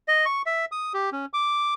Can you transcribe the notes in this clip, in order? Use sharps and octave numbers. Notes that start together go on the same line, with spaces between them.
D#5
C#6
E5
D#6
G4
C#4
D6